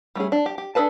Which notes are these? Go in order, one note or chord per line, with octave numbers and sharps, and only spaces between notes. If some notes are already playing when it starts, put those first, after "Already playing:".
G3 A3 C#4 G#4
D4
G4
G4
D4 G#4 A4 B4 A5